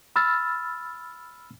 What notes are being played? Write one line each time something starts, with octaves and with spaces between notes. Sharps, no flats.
B5 E6 F6 A6